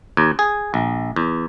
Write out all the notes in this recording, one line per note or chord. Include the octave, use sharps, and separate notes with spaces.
D#2
G#4
A#1
E2